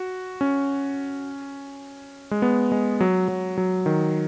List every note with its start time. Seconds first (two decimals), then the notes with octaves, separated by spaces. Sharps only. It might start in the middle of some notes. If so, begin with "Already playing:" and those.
Already playing: F#4
0.41 C#4
2.31 G#3
2.42 B3
2.72 G#3
3.00 F#3
3.28 F#3
3.58 F#3
3.86 D#3